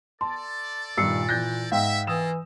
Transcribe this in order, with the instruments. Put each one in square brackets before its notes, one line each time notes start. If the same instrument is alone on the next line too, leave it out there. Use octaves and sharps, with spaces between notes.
[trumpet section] A4 D5 [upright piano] A5 [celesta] C6
[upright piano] G2 D#3 [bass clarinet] A#2 [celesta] E6 C7 C#7
[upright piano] E3 G6 A#6 [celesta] F#6
[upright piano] G#2 [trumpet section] E5 [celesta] F5 G5
[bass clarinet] E3 [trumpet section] A#3 F4 [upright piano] D#6 E6 E7